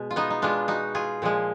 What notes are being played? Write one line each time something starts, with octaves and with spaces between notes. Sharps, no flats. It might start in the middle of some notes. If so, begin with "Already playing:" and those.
Already playing: B2 G#3
F4
B3 D#4
D#4
B2 G#3 D4 F4
D#4 F#4
F4 G#4
A#2 F3 G#3